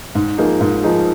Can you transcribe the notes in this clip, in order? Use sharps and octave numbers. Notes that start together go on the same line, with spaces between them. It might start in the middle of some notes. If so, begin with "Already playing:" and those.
G#2
F3 A#3 D#4 G#4
G#2
F3 A#3 D#4 G#4